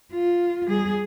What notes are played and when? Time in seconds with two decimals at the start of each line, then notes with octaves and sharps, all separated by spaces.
0.13 F4
0.68 G3 G#4